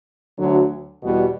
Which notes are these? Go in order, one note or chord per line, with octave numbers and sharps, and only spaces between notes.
D2 D3 F#3
E2 B2 G3 B3